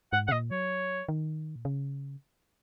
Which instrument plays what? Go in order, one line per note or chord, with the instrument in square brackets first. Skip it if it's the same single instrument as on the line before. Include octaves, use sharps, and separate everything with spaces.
[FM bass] G#2 [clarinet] F#5
[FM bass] C#3 [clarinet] F#5
[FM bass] A#2 [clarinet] D#5
[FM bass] F#3 [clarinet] C#5
[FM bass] D#3
A#2
C#3